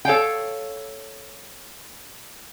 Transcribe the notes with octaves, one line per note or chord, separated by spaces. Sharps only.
A4 C#5 F5 G5